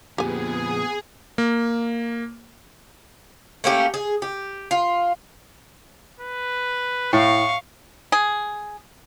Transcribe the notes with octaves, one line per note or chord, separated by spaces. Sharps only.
F2 A#2 B3 G4 G#4 G#5
A#3
A3 A#3 C#4 G4
G#4
G4
F4
B4
A2 F5 C#6
G#4